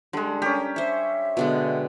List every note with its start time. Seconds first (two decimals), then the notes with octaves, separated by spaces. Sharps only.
0.13 D3 G3 G#3
0.42 C#4 G4 A#4
0.76 C5 C#5 E5
1.37 B2 D3 G#3